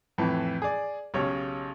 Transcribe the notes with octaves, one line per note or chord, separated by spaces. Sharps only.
F2 A2 E3
G#4 D5
B1 C#3 G4 C#5